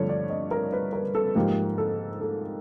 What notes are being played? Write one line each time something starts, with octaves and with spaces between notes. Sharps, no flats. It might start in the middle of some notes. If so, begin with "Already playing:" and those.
Already playing: G2 D3 F3 A3 C#5
D5
D#5
A#4
B4
A#4
A4
G#2 F3 A#3 G4
A4
A4